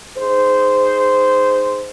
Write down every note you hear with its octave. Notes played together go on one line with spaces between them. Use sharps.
D#4 G#4 C5